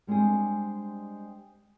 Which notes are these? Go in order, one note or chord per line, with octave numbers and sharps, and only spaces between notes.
G3 G#3 C4 D4 G#4